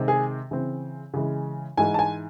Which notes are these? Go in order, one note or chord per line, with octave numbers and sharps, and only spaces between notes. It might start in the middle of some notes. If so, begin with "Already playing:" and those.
Already playing: C3 D#3 G#3 C4
G#4
C#3 E3 C4
C#3 E3 G#3
G#2 E3 G#3 G#5
A5
G#5